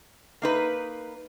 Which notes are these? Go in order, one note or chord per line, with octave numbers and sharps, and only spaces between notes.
A#3 D#4 B4